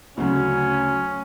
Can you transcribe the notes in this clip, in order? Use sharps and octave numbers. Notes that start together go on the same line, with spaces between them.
D2 C#3 F#3 C#4